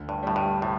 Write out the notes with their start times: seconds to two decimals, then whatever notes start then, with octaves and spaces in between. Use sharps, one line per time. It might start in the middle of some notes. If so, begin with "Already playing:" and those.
Already playing: D2
0.09 G2
0.23 A2 G3
0.36 G2
0.62 A2 C3